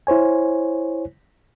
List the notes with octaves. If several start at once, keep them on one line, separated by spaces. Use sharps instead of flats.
E4 C5 C#5 G#5